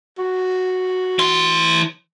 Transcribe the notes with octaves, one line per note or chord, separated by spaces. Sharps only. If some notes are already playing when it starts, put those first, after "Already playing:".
F#4
E3 C6